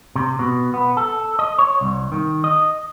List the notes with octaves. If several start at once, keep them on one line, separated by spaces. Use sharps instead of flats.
C3
B2
B3
A4
D#5
C#5
C2
D#3
D#5